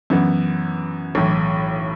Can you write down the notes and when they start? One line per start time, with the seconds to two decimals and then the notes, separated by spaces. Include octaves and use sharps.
0.10 F#2 E3 B3
1.15 B1 A2 E3